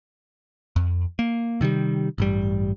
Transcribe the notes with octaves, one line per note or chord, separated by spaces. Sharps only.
F2
A#3
C3 D#3 F#3 G3
A1 G2 G3